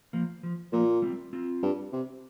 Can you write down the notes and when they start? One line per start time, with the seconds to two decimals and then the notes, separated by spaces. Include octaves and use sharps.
0.13 F3 A#3
0.43 F3
0.73 A#2 F3 A#3
1.02 G3 C4
1.33 C4 F4
1.63 G2
1.93 C3